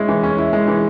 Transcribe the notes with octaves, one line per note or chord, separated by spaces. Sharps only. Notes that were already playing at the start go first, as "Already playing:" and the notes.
Already playing: G#3 C#4 E4
E3
C#4
E4
G#3
E3